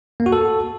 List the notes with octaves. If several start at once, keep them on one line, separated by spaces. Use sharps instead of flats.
A#3
F#4
A4